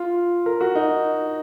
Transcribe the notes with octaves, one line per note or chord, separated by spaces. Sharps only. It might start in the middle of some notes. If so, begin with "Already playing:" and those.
Already playing: F4
A#4
F#4
D#4